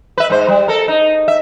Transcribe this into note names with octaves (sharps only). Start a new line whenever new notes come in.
B4 E5
G#2 C5
G3
A4 A#4
D#4
E5